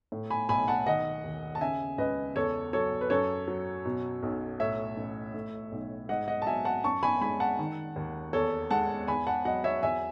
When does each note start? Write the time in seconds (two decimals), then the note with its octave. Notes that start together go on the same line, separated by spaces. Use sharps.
0.12 A2
0.30 G#5 B5
0.49 B1 G#5 B5
0.68 F#5 A5
0.87 D#3 D#5 F#5
1.24 D#2
1.55 A5
1.61 C#3 E5 G#5
1.98 C#2 B4 D#5
2.35 E2 A4 C#5
2.73 F#3 A4 C#5
3.01 B4
3.10 F#2 A4 C#5
3.48 F#3
3.85 B2
4.23 B1
4.60 A2 C#5 E5
4.97 A1
5.34 A2
5.72 B1
6.09 G#2 D#5 F#5
6.28 D#5 F#5
6.42 A5
6.47 F#3 E5 G#5
6.65 F#5 A5
6.84 F#2 A5 C#6
7.03 G#5 B5
7.21 G#3 G#5 B5
7.40 F#5 A5
7.59 D#3
7.96 D#2
8.33 E2 A4 C#5
8.71 G#3 F#5 A5
9.08 E2 G#5 B5
9.27 F#5 A5
9.45 F#3 D#5 F#5
9.64 C#5 E5
9.82 E2 E5 G#5